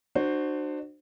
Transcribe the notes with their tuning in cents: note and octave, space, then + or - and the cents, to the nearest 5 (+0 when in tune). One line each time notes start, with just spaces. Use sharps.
D4 +35 F#4 +0 C5 +0